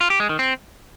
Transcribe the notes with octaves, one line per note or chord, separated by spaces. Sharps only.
F4
G4
G#3
D#3
C4